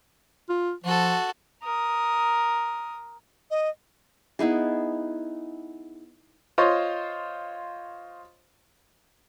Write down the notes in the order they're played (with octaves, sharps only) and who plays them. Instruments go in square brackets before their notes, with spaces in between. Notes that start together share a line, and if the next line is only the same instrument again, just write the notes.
[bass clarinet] F4
[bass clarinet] F3 [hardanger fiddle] F#4 A4
[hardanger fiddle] A#4 D#6
[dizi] D#5
[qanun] B3 D#4 E4 G#4
[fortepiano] F4 C5 C#5 D#5